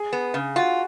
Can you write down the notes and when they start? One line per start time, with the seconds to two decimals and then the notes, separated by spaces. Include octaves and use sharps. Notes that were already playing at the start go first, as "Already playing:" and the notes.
Already playing: G#4
0.13 B3
0.34 C#3
0.56 F4 F#4